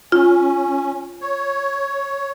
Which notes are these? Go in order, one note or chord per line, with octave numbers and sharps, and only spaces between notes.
C#4 F4
C#5